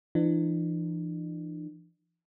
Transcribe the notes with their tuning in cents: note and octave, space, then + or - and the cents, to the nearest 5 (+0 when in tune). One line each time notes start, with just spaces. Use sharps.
E3 +35 D4 +45